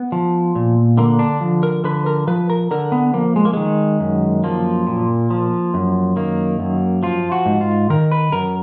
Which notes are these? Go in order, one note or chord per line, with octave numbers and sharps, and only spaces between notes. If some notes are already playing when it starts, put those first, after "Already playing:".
Already playing: B3
F3
A#2
D3 A#3
D4
F3
A#4
D3 B4
A#4
F3 B4
A#4
D3 A#4
B3
F3 A#3
G#3
A#3
D#3 G#3
F#2
F3 A#3
A#2
F3
F#2
D#3 A#3
F#2
F3 F4
F#4
G#2
F4
D#3 A#4
B4
F#2 A#4